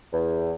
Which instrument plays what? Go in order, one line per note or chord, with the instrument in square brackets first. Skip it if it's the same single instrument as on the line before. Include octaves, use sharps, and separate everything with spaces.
[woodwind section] E2